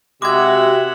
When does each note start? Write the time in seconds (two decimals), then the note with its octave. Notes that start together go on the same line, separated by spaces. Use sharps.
0.22 C3 G#3 F#4 G4 E5 F#5 D6 G#6